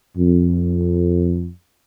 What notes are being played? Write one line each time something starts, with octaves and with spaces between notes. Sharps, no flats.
F2